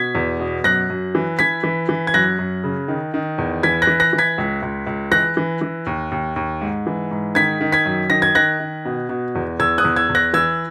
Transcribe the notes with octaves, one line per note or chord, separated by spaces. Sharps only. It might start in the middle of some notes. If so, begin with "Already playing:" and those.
Already playing: B2 G#6 B6
E2
B2
F#2 F#6 A#6
F#2
E3
E3 G#6 B6
E3
E3
G#6
F#2 F#6 A#6
F#2
C#3
D#3
D#3
E2
E3 G#6 B6
F#6 A#6
E3
F#6 A#6
E3
G#6 B6
C#2
C#2
C#2
E3 F#6 A#6
E3
E3
D#2
D#2
D#2
G#2
E3
G#2
D#3 G#6 B6
D#3
G#6 B6
F#2
D#3 A#6
G#6
D#3 F#6 A#6
D#3
B2
B2
E2
E2 E6 G#6
D#6 F#6
E2
E6 G#6
E2
F#6 A#6
E3 E6 G#6